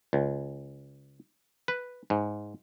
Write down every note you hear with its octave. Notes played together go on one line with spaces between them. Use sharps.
C#2
B4
G#2